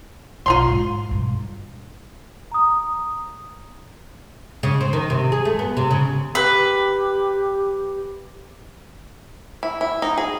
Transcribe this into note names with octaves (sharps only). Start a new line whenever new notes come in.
B1 C3 F4 A#5 C6
G#2
G2 B2
A#5 D#6
C#3
C4
D#3
C3
G#4
A3
B3
C3
C#3
G4 B4
E4
E4
D#4
G#4